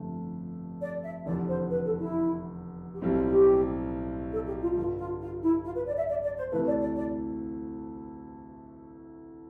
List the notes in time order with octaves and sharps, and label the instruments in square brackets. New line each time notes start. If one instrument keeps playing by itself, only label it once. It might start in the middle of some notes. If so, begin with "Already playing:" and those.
Already playing: [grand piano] G1 F2 D3 A3
[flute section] D5
E5
[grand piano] F1 E2 D3 [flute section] D5
[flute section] C5
B4
A4
E4
G4
[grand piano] B1 A2 G3 C4 [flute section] F4
[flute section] F4
F4
G4
A4
G4
F4
[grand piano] G2 D3 G3 [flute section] F4
[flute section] F4
F4
E4
F4
B4
D5
E5
D5
D5
C5
[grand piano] D2 C3 E3 A3 [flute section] B4
[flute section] D5
D5
D5